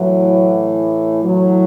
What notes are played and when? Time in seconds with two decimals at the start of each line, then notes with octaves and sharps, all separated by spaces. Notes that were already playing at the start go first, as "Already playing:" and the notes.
Already playing: A2 E3 F#3
1.22 A2 E3 F#3